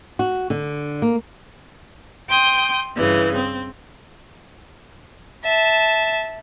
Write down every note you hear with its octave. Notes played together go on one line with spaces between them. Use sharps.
F#4
D3
A#3
G5 C6 D#6 G6
G2 C#3 E3
C4
E5 A5